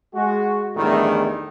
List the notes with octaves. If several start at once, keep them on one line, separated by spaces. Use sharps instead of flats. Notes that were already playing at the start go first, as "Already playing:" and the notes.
G#3 F#4
E2 A2 D3 D#3 G3 A3